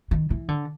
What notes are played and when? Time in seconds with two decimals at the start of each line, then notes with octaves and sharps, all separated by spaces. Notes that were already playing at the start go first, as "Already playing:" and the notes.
0.11 D#3
0.30 E3
0.48 D3